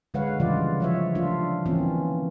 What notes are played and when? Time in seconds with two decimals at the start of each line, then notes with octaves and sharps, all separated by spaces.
0.14 D3 G#3 B4 C#5 F5 F#5
0.40 C#3 E3 F3 G3 F4 D5
0.80 F3 C#5 E5
1.15 A3 D4 F4
1.66 E3 A#3 C4 C#4 F4